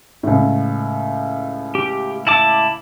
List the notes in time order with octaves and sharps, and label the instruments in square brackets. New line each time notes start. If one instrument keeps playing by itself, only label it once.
[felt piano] C#2 A2
[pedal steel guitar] G4
E4 A5 D6